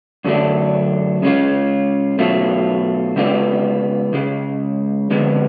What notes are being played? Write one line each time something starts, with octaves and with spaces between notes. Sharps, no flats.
F#2 D3 F#3 A3 D4
C#3 G#3 C#4 F4
B2 F#3 A3 F4
C#3 G#3 B3 D4 F4
C#2 C#3 G#3
F2 D3 G#3 B3